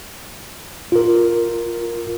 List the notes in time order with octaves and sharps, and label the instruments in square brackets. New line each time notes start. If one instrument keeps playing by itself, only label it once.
[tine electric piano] F4 A#4